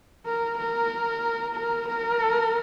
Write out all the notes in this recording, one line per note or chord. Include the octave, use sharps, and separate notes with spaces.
A#4
A#4
A#4
A#4